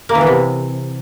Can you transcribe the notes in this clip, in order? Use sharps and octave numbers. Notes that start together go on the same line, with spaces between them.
A#3
E3
B3
C3